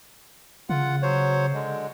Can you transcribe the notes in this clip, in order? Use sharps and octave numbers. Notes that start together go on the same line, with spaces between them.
C#3 F4 F#5
F#3 C5 C#5
D3 G#3